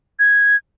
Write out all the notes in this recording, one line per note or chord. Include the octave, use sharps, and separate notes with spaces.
G#6